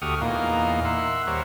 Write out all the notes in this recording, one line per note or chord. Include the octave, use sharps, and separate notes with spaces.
D2 F#4 G4 C#6 D#6 F6
E2 A#2 A#3 D#4 F5
E5 F#5 C6
D#2 G3 A#4 C5 C#5